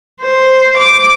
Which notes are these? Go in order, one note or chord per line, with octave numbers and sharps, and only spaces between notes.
C5
D6